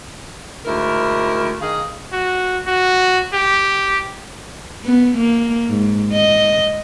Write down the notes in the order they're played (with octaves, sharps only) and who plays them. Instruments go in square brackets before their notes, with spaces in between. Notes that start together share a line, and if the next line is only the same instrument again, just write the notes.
[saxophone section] D2 G#2 E4 A#4
D#3 G#4 D#5 F5
[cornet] F#4
F#4
G4
[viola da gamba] B3
A#3
G#2
D#5